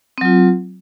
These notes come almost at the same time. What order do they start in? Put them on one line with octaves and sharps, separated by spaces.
C4 F#3 F4